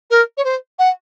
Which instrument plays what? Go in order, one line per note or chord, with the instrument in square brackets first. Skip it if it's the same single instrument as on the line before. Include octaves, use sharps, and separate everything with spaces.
[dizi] A#4
C#5
C5
F#5